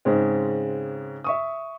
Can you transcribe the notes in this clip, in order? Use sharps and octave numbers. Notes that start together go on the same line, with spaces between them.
G#2 C#3 G#3 C4
E5 C#6 D#6